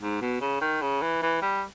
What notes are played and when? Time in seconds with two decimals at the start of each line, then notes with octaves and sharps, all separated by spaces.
0.01 G#2
0.22 B2
0.41 C#3
0.61 D#3
0.82 C#3
1.02 E3
1.22 E3
1.42 G3